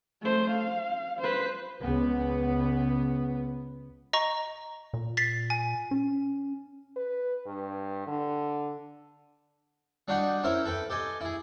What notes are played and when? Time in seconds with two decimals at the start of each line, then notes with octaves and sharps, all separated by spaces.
0.22 A3 C5
0.50 F5
1.19 B4 C5
1.81 C#2 B3
4.13 D#5 A#5 C#6
4.93 A#2
5.17 A6 B6 C7
5.50 G#5
5.91 C#4
6.96 B4
7.46 G2
8.07 D3
10.08 G3 D4 D#4 F#4 F#5
10.43 C#4 E4 A#4 C5 E5
10.65 A4 B4 G5 B5
10.90 G4 A4 D#5 G#5
11.21 E4 G#4